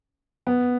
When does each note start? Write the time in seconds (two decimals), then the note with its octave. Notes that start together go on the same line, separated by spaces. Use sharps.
0.47 B3